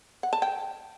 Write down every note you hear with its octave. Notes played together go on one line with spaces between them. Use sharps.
F#5
A5
G5